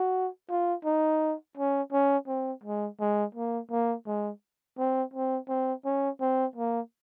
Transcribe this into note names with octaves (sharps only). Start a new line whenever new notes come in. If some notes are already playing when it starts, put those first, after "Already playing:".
Already playing: F#4
F4
D#4
C#4
C#4
C4
G#3
G#3
A#3
A#3
G#3
C4
C4
C4
C#4
C4
A#3